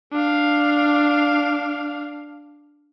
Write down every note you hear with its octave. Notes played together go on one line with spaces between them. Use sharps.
D4 F5